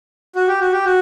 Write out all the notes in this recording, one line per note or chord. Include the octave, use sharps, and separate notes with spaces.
F#4
G4
F#4
G4
F#4